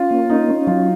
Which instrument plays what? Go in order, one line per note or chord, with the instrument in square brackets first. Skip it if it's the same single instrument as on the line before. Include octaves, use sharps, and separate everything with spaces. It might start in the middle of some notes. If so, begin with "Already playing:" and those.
Already playing: [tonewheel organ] C#4 [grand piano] F4
[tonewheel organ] A#3
[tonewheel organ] C#4 [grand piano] D#4
[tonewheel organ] C#4
[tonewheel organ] F#3 [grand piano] F4